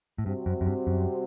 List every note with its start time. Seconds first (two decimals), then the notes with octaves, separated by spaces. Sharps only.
0.18 A2
0.26 G2 C3 G3 C4 F#4
0.46 F#2
0.61 F#2
0.66 G2
0.87 F#2